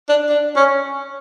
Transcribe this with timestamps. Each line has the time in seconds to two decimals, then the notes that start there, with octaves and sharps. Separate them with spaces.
0.09 D4
0.29 D4
0.56 C#4